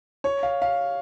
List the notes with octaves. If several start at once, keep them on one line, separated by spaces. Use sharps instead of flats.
C#5
F5
F5